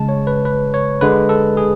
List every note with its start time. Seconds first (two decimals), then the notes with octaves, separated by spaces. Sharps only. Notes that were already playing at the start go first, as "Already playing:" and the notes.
Already playing: C#3 G#3 A5
0.09 C#5
0.27 B4
0.45 B4
0.74 C#5
1.01 D3 G#3 B4
1.29 A4
1.57 G#4